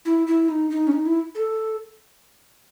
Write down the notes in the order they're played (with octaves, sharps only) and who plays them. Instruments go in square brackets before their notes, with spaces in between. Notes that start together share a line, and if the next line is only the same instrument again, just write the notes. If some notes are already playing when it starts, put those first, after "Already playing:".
[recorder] E4
E4
D#4
D#4
C#4
D#4
E4
A4